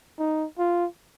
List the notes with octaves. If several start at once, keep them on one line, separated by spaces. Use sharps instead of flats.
D#4
F4